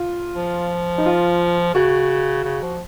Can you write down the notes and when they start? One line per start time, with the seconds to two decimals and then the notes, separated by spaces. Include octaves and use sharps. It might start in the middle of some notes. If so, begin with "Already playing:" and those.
Already playing: F4
0.36 F3
0.98 D#4
1.06 F4
1.74 C#3 F#4
2.44 C#3
2.62 F3